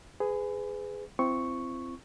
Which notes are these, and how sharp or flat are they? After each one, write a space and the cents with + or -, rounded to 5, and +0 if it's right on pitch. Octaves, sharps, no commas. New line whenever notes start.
G#4 +0 B4 +30
C4 -10 E4 +45 C#6 +0